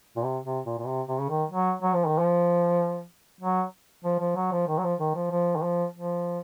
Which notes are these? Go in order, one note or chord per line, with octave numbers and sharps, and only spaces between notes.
A#2
C3
C3
A#2
A#2
C3
C3
C#3
D#3
F#3
F#3
F3
D#3
F3
F#3
F3
F3
F#3
F3
D#3
F#3
F3
D#3
F3
F3
D#3
F3
F3